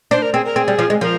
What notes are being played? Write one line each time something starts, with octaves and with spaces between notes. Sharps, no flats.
D4 C5
A#4
C4 G#4
A#4
C4 G#4
G3
F3
G#3
F3 A#4